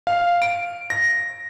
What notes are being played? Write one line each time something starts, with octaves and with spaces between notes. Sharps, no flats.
F5
D7
A#6